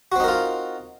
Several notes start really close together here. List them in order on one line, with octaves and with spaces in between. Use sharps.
F#4 C4 D#4 A#4 F4